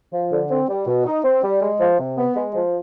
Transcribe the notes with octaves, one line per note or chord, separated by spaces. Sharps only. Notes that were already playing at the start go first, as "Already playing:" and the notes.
F3
D3
C4
G3
B2
D#4
C4
G3
G#3
F3
C3
B3
G#3
F3